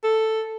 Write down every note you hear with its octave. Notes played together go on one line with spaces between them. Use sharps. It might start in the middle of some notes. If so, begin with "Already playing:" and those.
A4